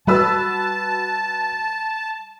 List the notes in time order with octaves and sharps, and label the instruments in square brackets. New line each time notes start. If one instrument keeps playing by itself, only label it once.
[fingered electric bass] G3 [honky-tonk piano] F#4 B4 E6 [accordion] A5